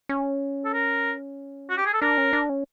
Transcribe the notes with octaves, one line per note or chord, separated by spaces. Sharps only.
C#4
A4
A#4
F#4
G4
G#4
A4
D4 A#4
C#4
D4
C#4